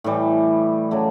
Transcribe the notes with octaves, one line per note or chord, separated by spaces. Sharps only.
A2 E3 G3
C#3 F#3 A3